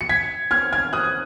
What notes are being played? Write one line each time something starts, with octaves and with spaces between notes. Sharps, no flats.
C#7
G#6 B6
F6 G#6
F6 G#6
D#6 F#6